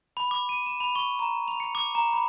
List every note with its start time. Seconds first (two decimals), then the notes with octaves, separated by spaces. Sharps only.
0.17 B5
0.31 D6
0.49 D#7
0.66 E7
0.80 B5
0.95 C#6
1.19 A#5
1.48 F7
1.60 C#7
1.75 D6
1.95 A#5
2.13 B5